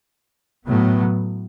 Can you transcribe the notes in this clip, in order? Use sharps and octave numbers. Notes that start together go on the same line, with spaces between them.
A2 F#3 B3